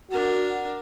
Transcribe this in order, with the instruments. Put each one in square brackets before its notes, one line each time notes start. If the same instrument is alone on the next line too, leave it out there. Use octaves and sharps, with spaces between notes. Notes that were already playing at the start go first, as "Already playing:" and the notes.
[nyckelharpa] D4 A#4 [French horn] F#4